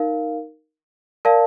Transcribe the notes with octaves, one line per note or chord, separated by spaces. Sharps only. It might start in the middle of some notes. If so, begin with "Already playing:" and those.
Already playing: D#4 A#4 F5
A#4 D5 F5 A5